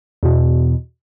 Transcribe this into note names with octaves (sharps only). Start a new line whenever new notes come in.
E2 B2